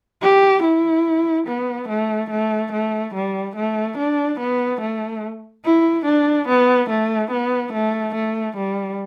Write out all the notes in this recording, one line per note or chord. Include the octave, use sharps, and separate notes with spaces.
G4
E4
B3
A3
A3
A3
G3
A3
D4
B3
A3
E4
D4
B3
A3
B3
A3
A3
G3